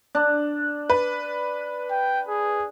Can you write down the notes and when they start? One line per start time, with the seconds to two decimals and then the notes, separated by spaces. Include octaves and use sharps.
0.15 D4
0.90 B4
1.90 G5
2.28 G#4